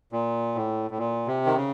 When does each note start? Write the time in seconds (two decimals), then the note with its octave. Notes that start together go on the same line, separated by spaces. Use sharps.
0.12 A#2
0.55 A2
0.91 A2
0.98 A#2
1.27 C3
1.46 D#3
1.55 C#3